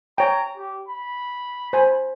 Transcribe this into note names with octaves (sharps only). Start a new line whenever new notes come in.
C#5 G5 A#5
G4
B5
C5 G#5